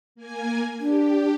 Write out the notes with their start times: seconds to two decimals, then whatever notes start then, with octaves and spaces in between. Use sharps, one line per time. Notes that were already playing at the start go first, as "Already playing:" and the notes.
0.15 A#3 G#5 G#6
0.80 D4 G4